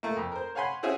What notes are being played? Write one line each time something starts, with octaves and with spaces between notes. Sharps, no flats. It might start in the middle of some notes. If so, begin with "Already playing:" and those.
A3 A#3
F2
A#4 C5
C#5 F5 F#5 G#5 B5 C6
C4 C#4 F#4 G#4 E5 F5